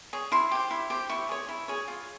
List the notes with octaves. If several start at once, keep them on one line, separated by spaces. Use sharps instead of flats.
G#4 C#5
E4 C6
G4 C5
E4
G4 C5
E4 C#6
G#4 C#5
E4
G#4 C#5
F4